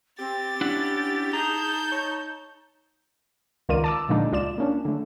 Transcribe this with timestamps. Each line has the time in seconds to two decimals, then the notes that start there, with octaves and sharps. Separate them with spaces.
0.19 C4 G4 A6
0.61 C#4 D4 E4 F#5
1.33 D#4 G#4 A5 A#5 G6
1.92 C#5
3.69 C#2 D#3 F4 A#4 D5 D#7
3.84 A5 D6 E6
4.09 A#2 D3 F3 G#3 D4 D#4
4.32 C#2 F4 D5 E7
4.58 A#3 C#4 D4
4.85 D3 A3